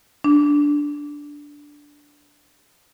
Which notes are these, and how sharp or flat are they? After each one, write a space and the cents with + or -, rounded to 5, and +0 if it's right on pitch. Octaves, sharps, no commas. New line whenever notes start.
D4 -5